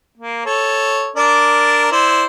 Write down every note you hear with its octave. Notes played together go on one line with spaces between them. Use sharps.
A#3
A4 C#5
D4 A#4 D5
E4 C5 D5